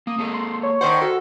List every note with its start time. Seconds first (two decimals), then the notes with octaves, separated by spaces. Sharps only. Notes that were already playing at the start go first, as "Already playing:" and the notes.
0.07 A#3 D#6
0.18 A#3 G#4 A4
0.34 C6
0.63 C#5
0.81 D#3 C5 D5 F#5
1.02 F#4 A4